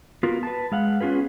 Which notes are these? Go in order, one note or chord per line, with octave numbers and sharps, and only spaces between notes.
B3 F4 F#4 A#4
B4 A5
G#3 F5 F#5
B3 C#4 F4 G#4 B4